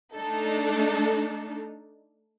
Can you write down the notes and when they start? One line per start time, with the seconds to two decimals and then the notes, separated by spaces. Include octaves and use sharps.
0.14 A3 D4 D#4 A4